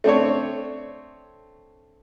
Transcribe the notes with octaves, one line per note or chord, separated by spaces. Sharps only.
A3 C4 D4 C#5